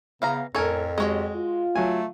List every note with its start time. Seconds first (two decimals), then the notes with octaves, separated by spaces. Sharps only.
0.22 C#3 E3 B3 F5 A#5
0.55 F2 A2 A4 A#4 C#5 G#5
0.98 F#3 G#3 C4 F#4 G4 C#5 D#5
1.36 F4
1.76 F#3 A3 G#5